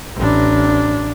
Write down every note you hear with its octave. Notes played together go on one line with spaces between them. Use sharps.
A1 D4